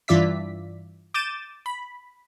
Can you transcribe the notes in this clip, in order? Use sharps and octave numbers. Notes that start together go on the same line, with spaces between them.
G2 E3 F4 D5 E5 B6
D6 G6 A6 D#7 E7
B5